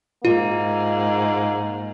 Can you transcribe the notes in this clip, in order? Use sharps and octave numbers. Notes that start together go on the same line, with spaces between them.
G#2 A#3 F4